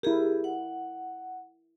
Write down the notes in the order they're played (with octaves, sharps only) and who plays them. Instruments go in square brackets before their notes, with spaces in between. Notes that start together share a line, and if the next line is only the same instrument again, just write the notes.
[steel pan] E4 A#4 [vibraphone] G4 G#4
[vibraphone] F#5